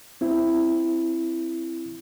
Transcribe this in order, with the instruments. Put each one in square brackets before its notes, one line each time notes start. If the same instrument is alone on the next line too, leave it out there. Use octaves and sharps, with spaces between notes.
[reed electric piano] C4 E4